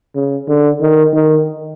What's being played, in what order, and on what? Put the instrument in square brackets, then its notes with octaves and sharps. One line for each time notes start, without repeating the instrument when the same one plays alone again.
[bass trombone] C#3
D3
D#3
D#3